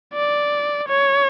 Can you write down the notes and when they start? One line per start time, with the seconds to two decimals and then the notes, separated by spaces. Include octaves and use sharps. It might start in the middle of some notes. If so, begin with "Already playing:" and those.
0.14 D5
0.88 C#5